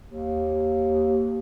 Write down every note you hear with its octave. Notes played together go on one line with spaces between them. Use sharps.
D#2